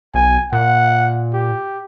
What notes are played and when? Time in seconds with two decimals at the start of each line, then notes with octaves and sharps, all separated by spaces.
0.14 B1 G#5
0.53 A#2 F#5
1.34 G4